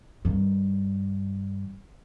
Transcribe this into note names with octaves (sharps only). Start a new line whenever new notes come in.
G2 D#3